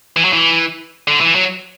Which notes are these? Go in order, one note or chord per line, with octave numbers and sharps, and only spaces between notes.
E3
F#3
E3
D3
E3
F#3